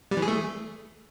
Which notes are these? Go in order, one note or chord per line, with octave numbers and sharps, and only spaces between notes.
G3
E3
G#4
A3